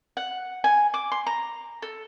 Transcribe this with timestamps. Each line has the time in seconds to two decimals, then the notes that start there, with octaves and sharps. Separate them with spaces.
0.17 F#5
0.64 G#5
0.94 D6
1.12 C6
1.26 A#5
1.82 A4